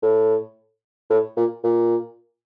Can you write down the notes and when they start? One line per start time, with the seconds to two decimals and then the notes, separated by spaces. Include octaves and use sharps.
0.03 A2
1.10 A2
1.37 A#2
1.64 A#2